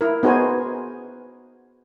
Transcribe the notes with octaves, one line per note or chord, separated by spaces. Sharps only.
E4 A#4
B3 D#4 F#4 G#4 C5 G#5